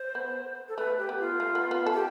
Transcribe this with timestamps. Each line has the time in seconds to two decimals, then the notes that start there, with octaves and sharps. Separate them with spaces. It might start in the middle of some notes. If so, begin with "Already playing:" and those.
Already playing: C5
0.15 B3
0.69 A4
0.77 A3 B4
0.98 G4
1.09 B3
1.19 F4
1.40 A3
1.55 B3
1.71 B3
1.86 A4
1.94 G4